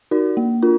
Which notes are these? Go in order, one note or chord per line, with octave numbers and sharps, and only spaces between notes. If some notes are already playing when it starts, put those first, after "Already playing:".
D#4 F#4 A#4 D5
A#3
D4 F4 A#4